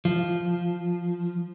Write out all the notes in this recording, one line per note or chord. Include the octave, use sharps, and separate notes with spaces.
F3